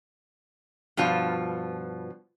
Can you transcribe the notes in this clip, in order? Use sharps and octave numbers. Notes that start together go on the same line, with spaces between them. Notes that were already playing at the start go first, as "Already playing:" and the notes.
G2 B2 F3 F4 A5